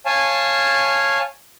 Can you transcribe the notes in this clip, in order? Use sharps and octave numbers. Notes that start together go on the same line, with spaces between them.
C#5 F5 G#5 A5